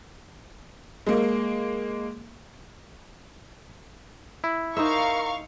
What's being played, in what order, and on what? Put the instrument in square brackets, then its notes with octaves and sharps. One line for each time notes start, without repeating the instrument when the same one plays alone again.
[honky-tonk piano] G#3 A#3
[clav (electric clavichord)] E4
[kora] D#4 C5 E5 [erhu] A#4 [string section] F5 C#6